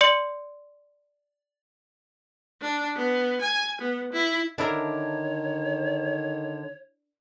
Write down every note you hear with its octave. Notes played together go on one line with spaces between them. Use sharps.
D5 C6 C#7 F#7
D4
B3
G#5
B3
E4
D3 D#3 D4 E4 A#4 C#5